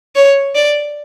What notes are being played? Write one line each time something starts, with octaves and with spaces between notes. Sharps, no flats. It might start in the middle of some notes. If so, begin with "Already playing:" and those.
C#5
D5